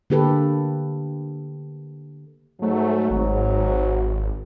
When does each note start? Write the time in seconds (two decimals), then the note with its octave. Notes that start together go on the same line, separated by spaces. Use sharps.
0.10 D3 A#3 G4 A4 B4
2.62 G#2 F#3 A3
3.10 G#1